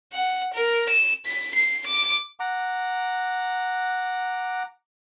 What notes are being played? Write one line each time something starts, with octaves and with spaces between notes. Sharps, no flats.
F#5
A#4
E7
B6
C7
D6
F#5 A#5 D6